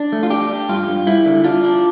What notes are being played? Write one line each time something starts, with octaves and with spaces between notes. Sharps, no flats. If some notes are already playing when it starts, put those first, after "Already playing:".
Already playing: D4
A3
F4
D4 G4
D4
G2 F4
G2
G3 E4
D3
D4 F4
D4